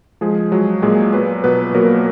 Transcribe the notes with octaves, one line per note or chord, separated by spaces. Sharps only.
F3 G#3 G#4
F#3 G#3 F#4
A#2 G#3 G#4
F#3 B3 B4
B2 B3 B4
F#3 A#3 A#4